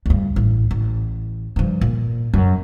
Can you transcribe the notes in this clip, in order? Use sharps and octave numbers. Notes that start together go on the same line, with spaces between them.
D2 G2
A1
A1
G2 F3
A#2
F#2